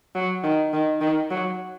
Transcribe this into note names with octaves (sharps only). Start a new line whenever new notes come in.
F#3
D#3
D#3
D#3
F#3